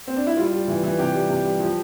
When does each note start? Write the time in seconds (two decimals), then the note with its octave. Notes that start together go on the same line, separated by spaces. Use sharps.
0.07 C4
0.17 D4
0.27 E4
0.37 G3 F4
0.53 G3
0.68 E3
0.83 E3
0.99 C3 G4
1.15 G3
1.29 C3
1.45 G3
1.60 F3